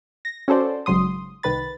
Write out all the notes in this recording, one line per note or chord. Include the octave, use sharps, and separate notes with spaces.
A#6
C#4 F#4 A4 C5 D5
G#1 G#2 C#3 F#3 C6 D#6
C2 D#3 B4 B5 A6